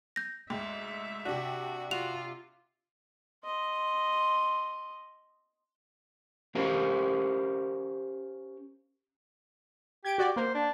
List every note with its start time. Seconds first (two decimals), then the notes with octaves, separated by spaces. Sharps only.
0.16 G6 A#6
0.50 D2 G#2 E5
1.25 C3 D4 F#4
1.91 F4 F#4 F7
3.44 D#5 C6
6.55 C#4 G4 A#4 C5 F5
10.05 G4 G#6 D7
10.18 F#4 D5
10.36 A#3 C5
10.54 D4